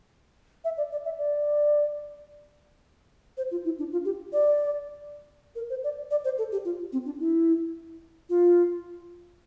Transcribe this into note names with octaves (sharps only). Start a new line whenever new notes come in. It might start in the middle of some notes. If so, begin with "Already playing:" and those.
E5
D5
D5
E5
D5
C5
F4
E4
D4
F4
G4
D5
A#4
C5
D5
D5
C5
A4
G4
F4
C4
D4
E4
F4